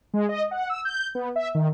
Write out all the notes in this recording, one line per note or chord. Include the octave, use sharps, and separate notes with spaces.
G#3
D#5
F#5
E6
G6
B3
E5
D#3